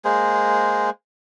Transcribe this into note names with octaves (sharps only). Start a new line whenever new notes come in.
G#3 A#3 G#4 C5